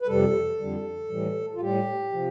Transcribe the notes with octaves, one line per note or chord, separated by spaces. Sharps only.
B4
F2 C3 G3 A4
F2 D3 G3
A2 E3 G3
F4
A2 G3 G4
C3 F3